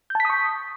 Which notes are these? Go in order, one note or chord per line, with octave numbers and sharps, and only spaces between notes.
A5 C#6 D#6 G6 B6